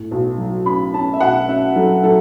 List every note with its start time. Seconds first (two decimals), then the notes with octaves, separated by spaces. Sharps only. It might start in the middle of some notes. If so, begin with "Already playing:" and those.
Already playing: A2
0.11 B1
0.38 F#3
0.66 C#4 B5
0.94 C#4 A5
1.13 E5
1.20 B1 F#5
1.48 C#4 E5
1.76 F#3 A4
2.03 F#3 A4